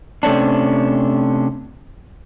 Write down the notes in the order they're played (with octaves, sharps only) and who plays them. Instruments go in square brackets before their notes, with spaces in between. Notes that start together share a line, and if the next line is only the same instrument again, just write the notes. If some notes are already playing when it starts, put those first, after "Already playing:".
[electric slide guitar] C3 A3 C#4 D4